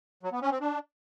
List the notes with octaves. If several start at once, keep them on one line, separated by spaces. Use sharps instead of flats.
F#3
B3
C#4
C4
D4